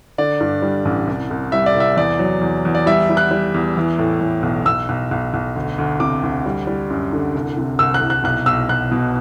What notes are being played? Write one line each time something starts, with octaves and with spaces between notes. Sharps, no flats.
D3 D5
G2
G3
A1
C2
C2
G3 E5
D5
C2
E5
E2 D5
F#3
E2
E2
D5
G3 E5
G3
F#6
G3
E2
E3
A2
A2
B1
B1 E6
B1
B1
B1
D2
D2
C3 D6
D2
G3
G3
F#2
D3
C2
C3
C2 E6
F#6
C2
F#6
B1 F#6
B1 E6
B1 F#6
B2